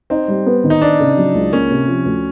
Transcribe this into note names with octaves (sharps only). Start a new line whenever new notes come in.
C4 D#4
G3
B3
D#3
D#4
B3 D4
C#3
F#3
C#2
A#3 C#4
C3
F3
D2